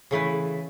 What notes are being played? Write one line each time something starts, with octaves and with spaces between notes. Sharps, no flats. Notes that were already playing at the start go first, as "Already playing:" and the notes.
C#3 E3 A3 E4 B4